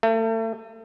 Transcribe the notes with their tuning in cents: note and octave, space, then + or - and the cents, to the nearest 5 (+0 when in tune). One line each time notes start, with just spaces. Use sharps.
A3 +35